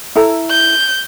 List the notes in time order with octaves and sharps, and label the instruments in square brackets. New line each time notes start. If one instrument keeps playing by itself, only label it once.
[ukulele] E4 A4 A#5
[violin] G6